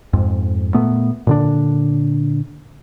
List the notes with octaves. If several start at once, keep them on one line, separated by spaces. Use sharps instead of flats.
F2 G#2
A#2 A3 B3
A#2 D3 D4